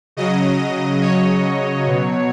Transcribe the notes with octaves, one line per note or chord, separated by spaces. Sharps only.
C#3 F#3 D#5
C#5
B2 F#3